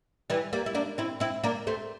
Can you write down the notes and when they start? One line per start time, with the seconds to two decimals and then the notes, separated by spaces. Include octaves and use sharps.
0.30 E3 G3
0.53 G3 A#3
0.66 E4
0.75 A#3 D4
0.98 C4 E4
1.20 C4 E4
1.44 A#3 D4
1.67 A3 C4